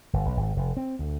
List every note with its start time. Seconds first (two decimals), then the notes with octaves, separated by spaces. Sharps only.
0.13 G1
0.26 B1
0.37 G#1
0.56 F1
0.77 C4
0.99 D2